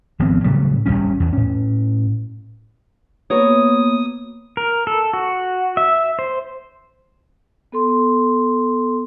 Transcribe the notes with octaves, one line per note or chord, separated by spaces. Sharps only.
G#1 F3 B3 C4
A2 C#3 F#3 G3
G#1 F#2 G3 C#4
E2
A2 C#4
A#3 B3 F#4 B4 C#5 D#6
A#4
A4
F#4
E5
C5
B3 A4 C6